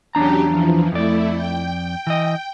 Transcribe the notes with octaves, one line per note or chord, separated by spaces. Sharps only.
E2 F#3 C#4 D4 G4 A#5
E3 F3
F2 A3 E4 D5
G5
E3 D#5